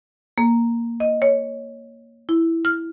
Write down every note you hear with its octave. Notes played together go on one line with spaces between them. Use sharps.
A#3
D#5
C#5
E4
F6